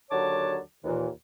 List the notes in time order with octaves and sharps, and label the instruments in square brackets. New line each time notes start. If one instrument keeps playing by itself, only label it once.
[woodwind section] D#2 D3 F#3 C#5 A5 D6
D#2 A#2 E3